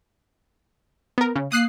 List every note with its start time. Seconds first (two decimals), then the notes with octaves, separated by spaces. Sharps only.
1.18 B3 A#4
1.36 C#3
1.52 A#3 D#6 F#6 C7